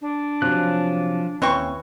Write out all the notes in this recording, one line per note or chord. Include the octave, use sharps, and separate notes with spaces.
D4
C3 F3 F#3 C#4 F#6
D#2 E3 C4 C#4 C#6